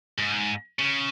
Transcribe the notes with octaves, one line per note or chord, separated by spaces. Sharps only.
G#2
C#3